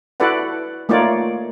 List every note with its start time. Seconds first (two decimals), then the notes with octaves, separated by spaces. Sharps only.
0.20 E4 F#4 A4 B4 D5 F#5
0.89 A3 A#3 D#4 F4 C#5 D5